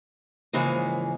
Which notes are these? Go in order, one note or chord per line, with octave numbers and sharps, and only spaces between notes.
G#2 C#3 E3 F3 G#3 A#3